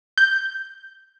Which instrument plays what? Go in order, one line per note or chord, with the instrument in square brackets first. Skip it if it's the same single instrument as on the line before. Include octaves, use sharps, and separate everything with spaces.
[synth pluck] G6